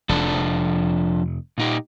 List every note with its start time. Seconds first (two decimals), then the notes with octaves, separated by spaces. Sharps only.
0.09 F1 F3 D4 A4
1.58 A#2 D#4 G4